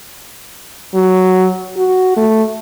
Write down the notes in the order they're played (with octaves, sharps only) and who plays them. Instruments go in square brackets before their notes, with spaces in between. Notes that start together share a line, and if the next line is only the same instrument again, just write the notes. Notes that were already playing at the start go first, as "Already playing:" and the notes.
[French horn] F#3
F#4
A3